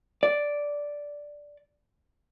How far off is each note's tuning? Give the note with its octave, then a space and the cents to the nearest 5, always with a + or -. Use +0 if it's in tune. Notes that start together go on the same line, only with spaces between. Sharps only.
D5 -5